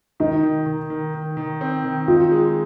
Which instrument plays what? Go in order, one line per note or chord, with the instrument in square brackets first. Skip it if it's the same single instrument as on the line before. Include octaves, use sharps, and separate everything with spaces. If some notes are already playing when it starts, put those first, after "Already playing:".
[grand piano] D#3 [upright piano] D#4
[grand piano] D#3
D#3
D#3
D#3
D#3
C4
D#3
[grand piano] D#4 [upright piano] F4
[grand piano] G#3